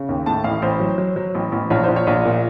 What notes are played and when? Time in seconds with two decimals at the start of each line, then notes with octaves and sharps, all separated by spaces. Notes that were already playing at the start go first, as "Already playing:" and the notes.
Already playing: C#3
0.09 D#2
0.26 A2 A5
0.44 A1 F5
0.62 A1 C5
0.80 F#3
0.98 F#3
1.16 F#3
1.35 A1
1.52 A1
1.70 A#1 C#5
1.84 A#1 C5
1.96 C#5
2.07 A#1
2.25 A#2